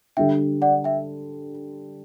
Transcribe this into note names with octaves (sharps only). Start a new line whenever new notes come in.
D3 G3 D4 E5 G5
D5 F#5
E5 G5